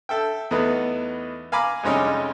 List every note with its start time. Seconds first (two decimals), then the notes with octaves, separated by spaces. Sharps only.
0.09 A4 E5 G5
0.51 E2 A3 B3 D#4 B4
1.52 F5 G#5 A#5 B5 D6
1.83 F2 C3 G3 G#3 C#4 D#4